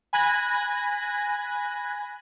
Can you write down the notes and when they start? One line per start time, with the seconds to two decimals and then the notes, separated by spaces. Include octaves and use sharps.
0.13 G#5 B5 F#6 G#6 A#6